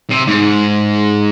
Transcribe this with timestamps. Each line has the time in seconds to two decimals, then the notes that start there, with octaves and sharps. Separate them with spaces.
0.10 C3
0.27 G#2